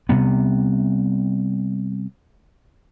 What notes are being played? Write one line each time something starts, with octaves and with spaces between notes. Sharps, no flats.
C3 G3 B3